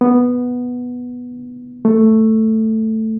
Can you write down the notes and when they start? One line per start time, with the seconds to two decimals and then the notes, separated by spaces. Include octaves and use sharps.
0.01 B3
1.85 A3